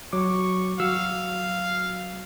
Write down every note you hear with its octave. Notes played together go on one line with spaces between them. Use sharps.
F#3 C#6 D6
F#3 F5 E6